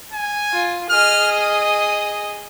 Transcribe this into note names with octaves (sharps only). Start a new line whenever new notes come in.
G#5
F4
G#4 D#5 F6
D#6